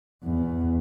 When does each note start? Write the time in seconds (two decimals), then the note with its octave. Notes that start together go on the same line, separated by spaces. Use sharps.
0.23 E2